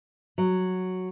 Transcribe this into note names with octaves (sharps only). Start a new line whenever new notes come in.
F#3